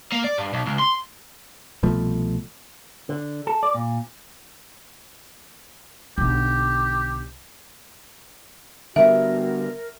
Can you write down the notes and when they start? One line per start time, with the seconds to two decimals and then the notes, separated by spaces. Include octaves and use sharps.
0.12 A#3
0.24 D5
0.38 G2
0.54 B1
0.66 C#2
0.79 C6
1.83 C2 B2 F3 A3
3.09 D3
3.47 A4
3.63 D5
3.74 A#2
6.18 B1 D3 G4
8.96 D3 G3 B3 F#4 A#4 E5